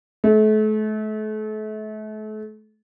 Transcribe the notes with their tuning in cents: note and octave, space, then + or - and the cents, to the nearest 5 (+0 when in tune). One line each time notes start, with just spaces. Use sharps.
A3 -35